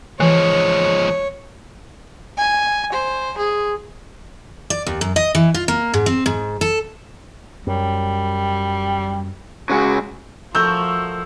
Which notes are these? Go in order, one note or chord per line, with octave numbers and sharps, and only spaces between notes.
E3 F3 G#3 C#5
G#5
C5
G#4
D5
D#2
F#2
D#5
E3
F4
A#3
G#2
C4
G#2
A4
F#2 G3
C#3 G#3 F#4
F3 A3 F#4 A#4 E6 G6